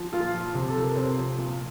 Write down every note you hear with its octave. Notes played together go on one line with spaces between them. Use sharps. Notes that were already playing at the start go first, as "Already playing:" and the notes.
Already playing: F3
A#2 F4
F3
C3
A4
F3
A#4
C3 C4 C5
F3
A#2